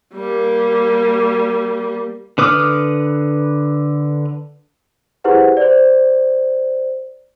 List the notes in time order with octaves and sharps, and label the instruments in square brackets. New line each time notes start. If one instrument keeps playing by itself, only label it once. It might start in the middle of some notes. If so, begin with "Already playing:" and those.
[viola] G3 A#3
[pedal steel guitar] D3 B4 D6 D#6 F6
[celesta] E4 G4 G#4 B4 C5 F#5
C5 D5